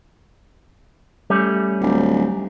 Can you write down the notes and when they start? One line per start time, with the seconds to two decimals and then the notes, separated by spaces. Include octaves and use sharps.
1.30 G3 A3 C#4
1.81 D1